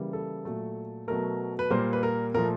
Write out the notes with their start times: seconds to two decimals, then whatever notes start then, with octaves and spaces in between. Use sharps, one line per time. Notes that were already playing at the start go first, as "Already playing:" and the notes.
Already playing: C#3 E3 G3 A#3
0.13 A4
0.45 A#2 F#3 A3
1.08 B2 F#3 A3 A#4
1.59 B4
1.70 A#2 G3 A#3 A#4 C5
1.93 B4
2.03 A#4
2.34 A#2 F3 A3 A#4